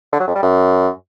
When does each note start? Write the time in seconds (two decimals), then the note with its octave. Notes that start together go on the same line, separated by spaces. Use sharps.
0.13 D3
0.20 F#3
0.28 F2
0.35 G3
0.43 F#2